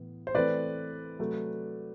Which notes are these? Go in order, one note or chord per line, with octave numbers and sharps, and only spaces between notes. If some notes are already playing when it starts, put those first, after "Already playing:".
Already playing: A2 E3 B3
C5
E3 A3 C4 B4 D5
C3 F#3 A3